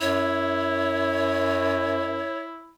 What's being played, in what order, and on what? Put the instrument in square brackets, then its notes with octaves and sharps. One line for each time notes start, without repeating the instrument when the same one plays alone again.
[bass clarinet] F#2 [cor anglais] E4 [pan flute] C#5